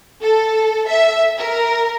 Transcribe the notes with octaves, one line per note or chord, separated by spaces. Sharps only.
A4
E5
A#4